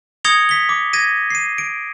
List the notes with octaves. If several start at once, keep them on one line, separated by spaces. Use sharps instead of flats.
D#6 G#6 A#6 C#7 F7 G7
B6 G7
D6
G#6 A#6 D#7
C7 D#7
D7